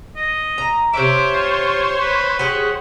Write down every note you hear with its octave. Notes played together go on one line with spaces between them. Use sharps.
D#5
A#5
C3 C5 C#5 E5 D6
F4
B4
G4 G#4 F#5